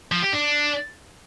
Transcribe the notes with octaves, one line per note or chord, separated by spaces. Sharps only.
F3
G4
D4